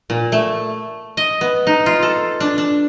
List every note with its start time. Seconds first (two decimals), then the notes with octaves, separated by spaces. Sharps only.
0.10 A#2
0.32 A3
1.17 D#5
1.41 B3
1.67 D#4
1.86 F4
2.03 A4
2.40 D4
2.58 D4